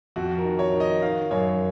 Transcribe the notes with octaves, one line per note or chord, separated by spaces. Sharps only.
F2 F#4
A#4
D#3
C#5
D#3
D#5
D#3 F5
F#2 C#5